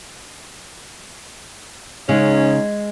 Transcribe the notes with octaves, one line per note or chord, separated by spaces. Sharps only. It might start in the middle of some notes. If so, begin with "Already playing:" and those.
C#3 G#3 C#4 D#4